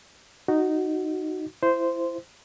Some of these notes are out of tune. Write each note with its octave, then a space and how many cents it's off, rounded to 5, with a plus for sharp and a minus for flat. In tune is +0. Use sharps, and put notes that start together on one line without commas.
D#4 -5 F#4 +0
E4 +25 C5 -10